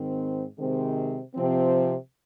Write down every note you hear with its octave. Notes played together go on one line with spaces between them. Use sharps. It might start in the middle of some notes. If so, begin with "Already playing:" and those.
Already playing: G#2 D#3 C4
C3 D#3 G#3 C4
C3 F3 C4